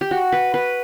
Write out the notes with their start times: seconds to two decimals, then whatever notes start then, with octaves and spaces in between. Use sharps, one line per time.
0.01 G4
0.11 F#4
0.32 B4
0.54 B4